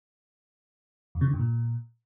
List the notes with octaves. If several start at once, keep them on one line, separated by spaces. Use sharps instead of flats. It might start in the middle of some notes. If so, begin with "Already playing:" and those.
F2
C#3
D3
G2
A#2